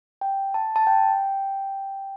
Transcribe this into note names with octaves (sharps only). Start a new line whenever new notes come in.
G5
A5
A5
G5